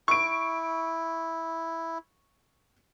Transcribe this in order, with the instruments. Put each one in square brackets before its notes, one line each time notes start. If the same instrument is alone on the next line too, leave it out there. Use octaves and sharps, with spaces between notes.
[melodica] E4 [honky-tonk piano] C#6 D7